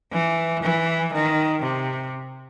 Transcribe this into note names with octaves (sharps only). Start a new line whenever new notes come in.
E3
E3
D#3
C3